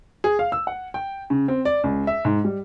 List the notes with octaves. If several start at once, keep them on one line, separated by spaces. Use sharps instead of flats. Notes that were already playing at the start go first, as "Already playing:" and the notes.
G#4
F5
E6
F#5
G5
C#3
C4
D5
C#2
E5
G#2
G3